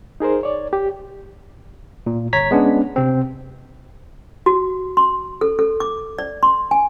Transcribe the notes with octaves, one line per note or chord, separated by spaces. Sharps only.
D#4 G#4 A#4 C5
C#5 D5
G4
A#2
G1 C#5 A#5 G#6 B6
G#3 B3 C#4 D4
C3 C4
F#4
C6
A4
A4
D6
D5
C6
G#5